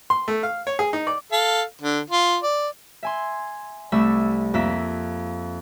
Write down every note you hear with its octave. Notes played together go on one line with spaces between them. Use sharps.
C6
A3
F5
C#5
G#4
D#4
D5
A4 F5
D3
F4
D5
E5 G#5 C6
C2 G3 A3 E5 C#6 E6
F2 A#3 E5 B6